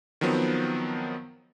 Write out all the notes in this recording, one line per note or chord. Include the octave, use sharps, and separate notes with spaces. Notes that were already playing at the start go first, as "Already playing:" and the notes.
D#3 F3 F#3 B3 C4